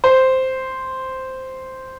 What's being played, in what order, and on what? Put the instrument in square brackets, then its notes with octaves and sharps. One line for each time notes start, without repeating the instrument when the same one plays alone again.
[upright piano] C5